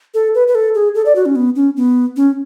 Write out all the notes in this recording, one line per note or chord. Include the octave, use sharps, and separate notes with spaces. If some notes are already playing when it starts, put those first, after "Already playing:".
A4
B4
B4
A4
G#4
A4
D5
F#4
C#4
B3
C#4
B3
C#4